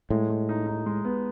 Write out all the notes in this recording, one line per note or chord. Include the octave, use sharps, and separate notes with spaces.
A2 G#3
G#3
D#4
D#4
G#3
B3